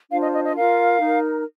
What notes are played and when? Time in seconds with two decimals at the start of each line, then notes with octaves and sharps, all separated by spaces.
0.10 D4 F4 C5 F5
0.22 D#5
0.33 D#5
0.44 D#5
0.55 F4 A#4 F5
1.00 D#4
1.05 A#4